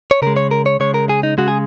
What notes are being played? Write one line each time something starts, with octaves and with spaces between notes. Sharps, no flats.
C#5
C#3 G#3 A#4
C#5
A#4
C#5
C#3 G#3 C#5
A#4
G#4
D#4
C#3 G#3 F#4
G#4